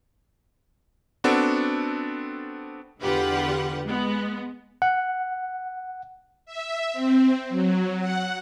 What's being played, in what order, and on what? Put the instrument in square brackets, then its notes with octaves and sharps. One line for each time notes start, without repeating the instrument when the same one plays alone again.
[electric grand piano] B3 C4 D4 F#4 A4
[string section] E2 D3 F4 G4 B4 F#5
G#3 B3
[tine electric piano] F#5
[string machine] E5
C4
F#3
F#5